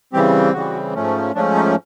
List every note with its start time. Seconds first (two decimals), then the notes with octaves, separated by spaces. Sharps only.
0.13 C#3 E3 G3 C4 G4
0.53 C#3 E3 G3 C4 F#4
0.95 G#2 F3 A3 C#4
1.35 G#2 F3 A3 C#4 D4
1.55 D#4